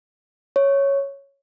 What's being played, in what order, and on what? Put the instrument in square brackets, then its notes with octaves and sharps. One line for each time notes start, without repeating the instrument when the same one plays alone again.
[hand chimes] C#5